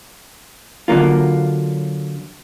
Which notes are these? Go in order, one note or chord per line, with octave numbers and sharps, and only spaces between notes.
D3 F#3 A#3 F4